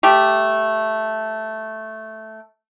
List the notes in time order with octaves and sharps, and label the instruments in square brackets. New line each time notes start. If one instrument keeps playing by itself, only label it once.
[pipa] A3 G4